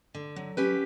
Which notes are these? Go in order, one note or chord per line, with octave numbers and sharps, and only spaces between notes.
D3
F#3
C#4 G4 B4